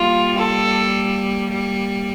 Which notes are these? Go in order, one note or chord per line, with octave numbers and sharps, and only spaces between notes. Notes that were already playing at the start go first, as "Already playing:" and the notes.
Already playing: G3 A#3 F4
A4